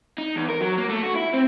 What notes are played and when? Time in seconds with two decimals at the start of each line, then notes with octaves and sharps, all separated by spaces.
0.18 D#4
0.36 E2
0.49 A#4
0.61 F#3
0.77 A#3
0.90 A3
1.04 F#4
1.16 E4
1.34 C4